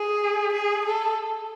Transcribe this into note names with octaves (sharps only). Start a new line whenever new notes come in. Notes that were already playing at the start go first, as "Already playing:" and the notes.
Already playing: G#4
G#4
A4